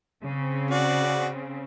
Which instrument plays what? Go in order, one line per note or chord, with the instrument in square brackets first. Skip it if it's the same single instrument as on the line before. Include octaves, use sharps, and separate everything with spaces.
[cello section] C#3 C4
[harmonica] F#4 D5